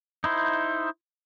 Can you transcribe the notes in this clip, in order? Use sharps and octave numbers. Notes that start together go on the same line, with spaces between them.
D#4 E4 C5